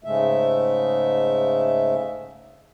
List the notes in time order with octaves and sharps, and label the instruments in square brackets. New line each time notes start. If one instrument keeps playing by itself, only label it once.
[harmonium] G#2 C#3 G#3 A3 E5